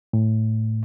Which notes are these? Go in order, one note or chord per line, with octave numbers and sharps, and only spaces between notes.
A2